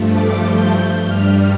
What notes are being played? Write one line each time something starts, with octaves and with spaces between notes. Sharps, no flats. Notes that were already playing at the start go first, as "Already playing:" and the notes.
Already playing: G2 F3 A3
D6
G6
G2 G3 F6